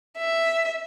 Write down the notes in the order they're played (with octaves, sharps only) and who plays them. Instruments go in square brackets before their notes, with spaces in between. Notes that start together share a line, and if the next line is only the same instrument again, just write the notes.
[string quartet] E5